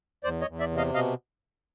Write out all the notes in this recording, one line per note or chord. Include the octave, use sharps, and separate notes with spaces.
E2 C5 D5
C#5 D#5
E2
D5 E5
C3
D#5 F5
B2 D#5 F5